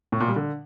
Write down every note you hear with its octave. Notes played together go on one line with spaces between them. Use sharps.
A2
A#2
G3
D3